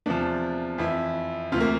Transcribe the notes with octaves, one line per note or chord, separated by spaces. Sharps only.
E2 C3 F3 D4
F2 E3 E4
D2 C3 E3 F4
A#3